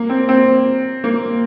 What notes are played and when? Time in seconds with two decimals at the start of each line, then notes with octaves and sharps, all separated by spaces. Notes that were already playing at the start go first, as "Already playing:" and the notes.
Already playing: A#3
0.10 C4
0.29 C4
1.04 A#3